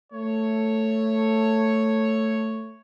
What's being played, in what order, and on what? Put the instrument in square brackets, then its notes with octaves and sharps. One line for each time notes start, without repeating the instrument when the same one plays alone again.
[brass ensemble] A3 C#5